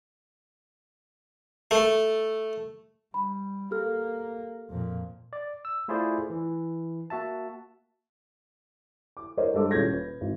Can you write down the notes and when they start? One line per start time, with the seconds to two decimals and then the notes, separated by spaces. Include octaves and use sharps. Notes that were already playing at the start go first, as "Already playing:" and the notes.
1.71 A3
3.14 G3 B5
3.71 A#3 G4 A4 F6
4.70 F2 A#2
5.33 D5
5.65 E6
5.88 A3 E4 F4 G#4 C5 D5
6.30 E3
7.10 A#3 F#4 E5 A5
9.17 D6
9.37 A#4 C5 C#5 D#5
9.54 G2 G#3 A4 D6
9.71 D#1 C#4 F4 G6 G#6 A#6
9.93 B4
10.21 G#1